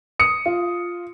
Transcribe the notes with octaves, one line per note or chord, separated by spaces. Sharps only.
D#6 C#7
F4